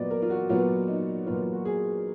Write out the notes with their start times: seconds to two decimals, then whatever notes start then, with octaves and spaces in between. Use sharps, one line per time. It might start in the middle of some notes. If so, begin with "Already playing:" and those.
Already playing: A#2 F#3 B3 D5 D#5
0.11 A#4
0.22 F4
0.30 F#4
0.49 A#2 F#3 B3 F4
0.88 D#4
1.26 A#2 F#3 B3 F4
1.41 F4
1.53 F#4
1.65 G#4